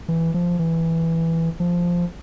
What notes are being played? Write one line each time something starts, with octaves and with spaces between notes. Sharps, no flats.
E3
F3
E3
F3